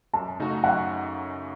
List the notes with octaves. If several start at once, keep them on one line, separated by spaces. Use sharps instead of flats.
F#2 A5
C#3 A3 D#4 F#4
F#2 F#5